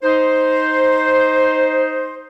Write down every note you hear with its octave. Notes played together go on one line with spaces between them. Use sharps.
D#4 C5